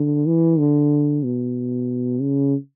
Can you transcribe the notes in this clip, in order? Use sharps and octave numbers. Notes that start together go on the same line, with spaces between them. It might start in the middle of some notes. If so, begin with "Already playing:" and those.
Already playing: D3
E3
D3
B2
C#3